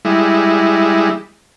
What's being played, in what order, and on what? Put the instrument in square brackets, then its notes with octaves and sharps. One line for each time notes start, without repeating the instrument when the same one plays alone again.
[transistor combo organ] G3 G#3 E4